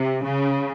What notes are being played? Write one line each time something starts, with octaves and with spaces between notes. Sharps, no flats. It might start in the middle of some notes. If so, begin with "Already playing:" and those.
Already playing: C3
C#3